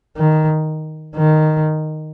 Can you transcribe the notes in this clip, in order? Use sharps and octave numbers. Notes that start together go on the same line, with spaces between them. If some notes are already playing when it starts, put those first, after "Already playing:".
D#3
D#3